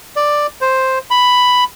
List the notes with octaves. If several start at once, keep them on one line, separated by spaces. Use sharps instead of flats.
D5
C5
B5